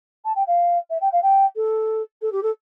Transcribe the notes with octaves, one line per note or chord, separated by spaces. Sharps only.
A5
G5
F5
E5
G5
F5
G5
A4
A4
G4
A4